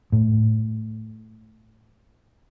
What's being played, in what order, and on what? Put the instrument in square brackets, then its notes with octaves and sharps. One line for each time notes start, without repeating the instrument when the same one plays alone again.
[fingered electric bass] A2